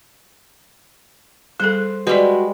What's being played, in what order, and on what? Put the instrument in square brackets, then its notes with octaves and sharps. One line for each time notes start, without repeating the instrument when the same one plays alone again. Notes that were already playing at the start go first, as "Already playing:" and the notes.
[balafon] G3 G#4 A4 [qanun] C5
[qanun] G3 G#3 [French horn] F#4 [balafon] B4 D5